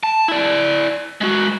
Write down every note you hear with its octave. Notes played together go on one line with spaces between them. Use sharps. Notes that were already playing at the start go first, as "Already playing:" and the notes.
A5
E4 D5
G#3 F#4